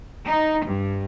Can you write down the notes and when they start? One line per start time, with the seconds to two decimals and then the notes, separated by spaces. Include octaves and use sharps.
0.24 D#4
0.64 G2